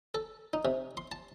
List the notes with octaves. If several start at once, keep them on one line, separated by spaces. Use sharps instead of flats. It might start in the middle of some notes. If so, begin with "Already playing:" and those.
A4
D#4
C3
C6
A5